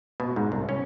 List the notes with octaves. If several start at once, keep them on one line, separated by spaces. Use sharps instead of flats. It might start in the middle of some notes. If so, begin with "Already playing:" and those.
B2
G#2
C2
C#4